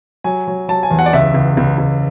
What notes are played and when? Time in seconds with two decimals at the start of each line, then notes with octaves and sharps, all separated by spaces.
0.24 F#3 G#5
0.48 F#3
0.68 F#3 A5
0.83 G#5
0.91 E2
0.99 F#5
1.06 D5
1.13 C#2 E5
1.34 C#2
1.57 C#2
1.78 C#2